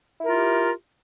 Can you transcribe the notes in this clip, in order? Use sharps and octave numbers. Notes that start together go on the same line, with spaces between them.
E4 F4 G4 A#4